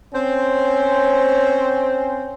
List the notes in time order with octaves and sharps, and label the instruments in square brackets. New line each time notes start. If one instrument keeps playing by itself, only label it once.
[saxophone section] C4 C5 [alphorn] C#4